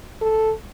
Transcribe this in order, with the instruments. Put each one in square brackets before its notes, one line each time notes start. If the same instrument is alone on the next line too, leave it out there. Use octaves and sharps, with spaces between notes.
[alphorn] A4